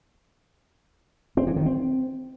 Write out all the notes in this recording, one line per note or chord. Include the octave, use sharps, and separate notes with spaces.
C4
E3
D#3
C4